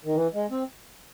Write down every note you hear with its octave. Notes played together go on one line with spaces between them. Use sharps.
D#3
E3
G#3
C4